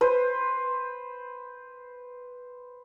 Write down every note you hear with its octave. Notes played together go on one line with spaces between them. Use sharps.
B4 C5